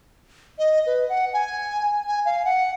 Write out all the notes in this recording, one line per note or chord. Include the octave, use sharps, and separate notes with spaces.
D#5
B4
F#5
G#5
G#5
F5
F#5